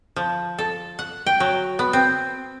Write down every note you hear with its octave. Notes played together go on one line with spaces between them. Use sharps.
F3
A4
F#5
G5
F#3
B3
C4